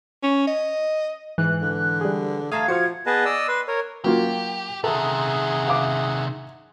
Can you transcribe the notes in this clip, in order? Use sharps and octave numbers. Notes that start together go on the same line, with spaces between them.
C#4
D#5
G#2 E3 F#6
D3
G3 G#4
A3 F5 A5 A#5 D#6 G#6
F3 F#4 C5 F5 C#7
B3 G#4 B4 D#5 A5
D5 D#5 D#6 E6
B4 C6
A#4 C#5
F#3 A#3 F4 G4
C3 D#3 G#4 A4 E5 F#5
F5 D6